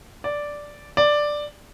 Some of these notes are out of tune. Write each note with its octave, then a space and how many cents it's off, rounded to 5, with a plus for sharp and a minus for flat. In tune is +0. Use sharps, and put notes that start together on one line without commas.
D5 -5
D5 +5